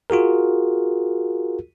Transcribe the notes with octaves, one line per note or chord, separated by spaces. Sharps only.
F4 F#4 G#4 A#4